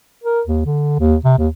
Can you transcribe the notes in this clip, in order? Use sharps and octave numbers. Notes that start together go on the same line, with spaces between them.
A#4
D#2
D3
D#2
C3
D#2